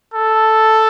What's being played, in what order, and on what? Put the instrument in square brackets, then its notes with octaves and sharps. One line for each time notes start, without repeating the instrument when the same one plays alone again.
[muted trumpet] A4